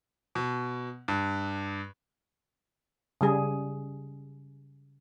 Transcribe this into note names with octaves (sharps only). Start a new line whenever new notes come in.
B2
G2
C#3 G3 G#4